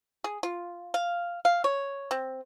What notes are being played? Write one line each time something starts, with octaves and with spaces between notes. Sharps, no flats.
G#4
F4
F5
F5
C#5
C4